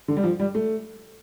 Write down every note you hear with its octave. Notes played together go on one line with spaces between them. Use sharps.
D3
G3
F3
G3
A3